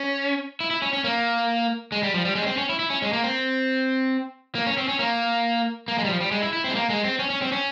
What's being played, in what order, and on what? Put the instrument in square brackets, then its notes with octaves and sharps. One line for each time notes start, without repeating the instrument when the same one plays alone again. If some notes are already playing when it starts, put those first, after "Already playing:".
Already playing: [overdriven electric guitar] C#4
E4
E4
C#4
C#4
A#3
G#3
G3
F3
G3
G#3
C#4
C4
C#4
E4
E4
C#4
G#3
A#3
C4
A#3
C#4
C4
C#4
A#3
A#3
G#3
G3
F3
G3
G#3
E4
E4
C4
G#3
A#3
G#3
C4
C#4
C#4
C4
C#4